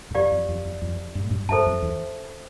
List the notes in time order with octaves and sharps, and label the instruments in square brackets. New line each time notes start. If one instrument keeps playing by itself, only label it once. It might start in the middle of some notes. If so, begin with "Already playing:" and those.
[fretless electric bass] G2
[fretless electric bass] F2 [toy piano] G4 D5 F5
[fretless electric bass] F2
F2
F2
F2
G2
A2
G2
[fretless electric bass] G2 [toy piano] A4 C5 E5 A5
[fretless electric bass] F2
E2